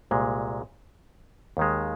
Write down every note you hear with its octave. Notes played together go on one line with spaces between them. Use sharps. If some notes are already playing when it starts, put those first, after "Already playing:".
C2 A#2 G#3
D#2 D#3 G#3